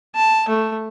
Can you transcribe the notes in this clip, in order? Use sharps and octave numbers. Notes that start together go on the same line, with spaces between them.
A5
A3